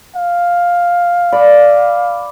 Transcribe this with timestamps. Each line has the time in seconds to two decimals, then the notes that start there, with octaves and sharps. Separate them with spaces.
0.15 F5
1.32 D5 B5